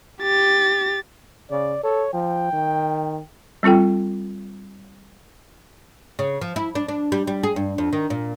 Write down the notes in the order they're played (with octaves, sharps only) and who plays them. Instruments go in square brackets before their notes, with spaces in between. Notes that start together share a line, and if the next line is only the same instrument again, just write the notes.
[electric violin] G4 A6
[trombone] C#3 [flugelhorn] D5
[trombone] A4 [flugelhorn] C#5
[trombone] F3 [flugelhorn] G5
[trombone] D#3
[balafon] G3 C4 F4 A4 G5
[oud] C#3
F3
E4
D4
D4
G3
G3
G#4
G2
F2
D#3
A#2